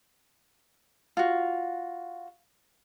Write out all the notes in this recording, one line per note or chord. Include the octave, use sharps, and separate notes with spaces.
F4 F#4